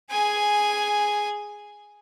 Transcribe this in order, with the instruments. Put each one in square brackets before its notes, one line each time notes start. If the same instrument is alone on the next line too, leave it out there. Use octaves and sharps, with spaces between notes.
[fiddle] G#4 G#5